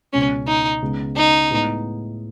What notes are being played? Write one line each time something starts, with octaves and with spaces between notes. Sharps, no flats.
C#2 B2 G#3 C#4
D#4
C#2 C#3 G#3 B3
D#4
A2 G#3 B3 E4